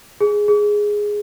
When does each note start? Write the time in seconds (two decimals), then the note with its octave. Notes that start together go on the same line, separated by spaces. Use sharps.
0.21 G#4
0.48 G#4